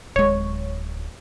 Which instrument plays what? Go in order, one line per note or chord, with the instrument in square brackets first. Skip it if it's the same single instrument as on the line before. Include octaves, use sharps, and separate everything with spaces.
[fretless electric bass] D1 G#3 [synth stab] C#5